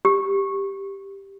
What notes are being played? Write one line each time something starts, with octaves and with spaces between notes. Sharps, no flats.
G4